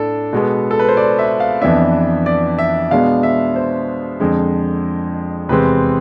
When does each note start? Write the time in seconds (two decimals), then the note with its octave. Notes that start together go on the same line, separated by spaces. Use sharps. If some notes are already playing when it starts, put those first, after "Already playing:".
Already playing: A2 D4 A4
0.33 B2 G#3 B3
0.71 A4
0.80 B4
0.88 C5
0.97 D5
1.19 E5
1.40 F5
1.62 F2 E3 B3 D4 E5
2.26 D5
2.59 E5
2.91 B2 G#3 B3 D4 F5
3.23 E5
3.56 C5
4.20 F2 D3 G#3
5.49 E2 C3 G#3 C4 B4